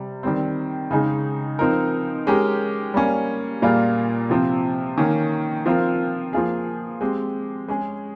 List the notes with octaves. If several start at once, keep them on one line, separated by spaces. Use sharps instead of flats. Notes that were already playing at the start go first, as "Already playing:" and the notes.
Already playing: C3 G3
D#3 G3 C4
C#3 G#3 D#4 G#4
F3 C4 D#4 A#4
G#3 C#4 G4 A#4
G3 A#3 C#4
A#2 G3 A#3 F4 G#4
C3 F3 C4
D#3 A#3 C#4
F3 C4 F4 A#4
F3 A#3 F4 G#4
G#3 C4 G4
G#3 C#4 G#4